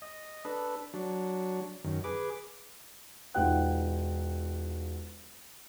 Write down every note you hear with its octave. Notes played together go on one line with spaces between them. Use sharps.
D#5
D4 A4 B4
F#3 D4
F#2 D#3
G#4 B4 D6
E1 D#4 F4 F#5 G5 F#6